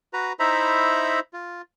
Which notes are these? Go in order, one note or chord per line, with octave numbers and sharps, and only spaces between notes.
F#4 B4 A#5
D#4 E4 C5 E5 A#5 B5
F4